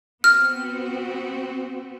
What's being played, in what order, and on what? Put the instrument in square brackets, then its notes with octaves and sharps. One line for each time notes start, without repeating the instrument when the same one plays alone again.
[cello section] B3 C4 F#4 [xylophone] F6